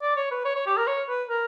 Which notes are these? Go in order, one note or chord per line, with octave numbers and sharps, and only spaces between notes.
D5
C#5
B4
C#5
C#5
G4
A#4
C#5
B4
A#4